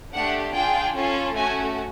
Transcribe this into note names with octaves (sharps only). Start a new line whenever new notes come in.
A3 D4 G4 F#5
D4 F4 G#4 G5
C#4 F4 A4
A3 C#4 F#4 G#5